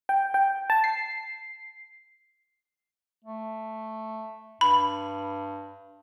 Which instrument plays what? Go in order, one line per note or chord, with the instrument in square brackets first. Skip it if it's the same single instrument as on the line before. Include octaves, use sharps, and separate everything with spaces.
[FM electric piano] G5
G5
A5
C7
[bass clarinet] A3
[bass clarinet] G2 [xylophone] B5